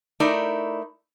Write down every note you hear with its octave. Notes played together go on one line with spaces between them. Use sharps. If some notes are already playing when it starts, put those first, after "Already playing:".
A3 D#4 E4 A#4 D5